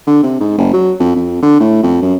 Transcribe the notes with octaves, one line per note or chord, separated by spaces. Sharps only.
D3
C3
G#2
F#1
F#3
F2
F2
D3
A2
F2
F#2